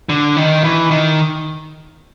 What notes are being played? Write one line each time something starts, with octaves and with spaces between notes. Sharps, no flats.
D3
D#3
E3
D#3